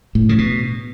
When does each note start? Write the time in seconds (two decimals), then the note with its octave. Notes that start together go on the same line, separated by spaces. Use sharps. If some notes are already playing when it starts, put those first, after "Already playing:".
0.15 A2
0.29 C#3
0.38 B2